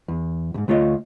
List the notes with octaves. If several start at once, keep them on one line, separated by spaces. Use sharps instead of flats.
E2
D2 G#2
D2 A3 F4 C#5 D#5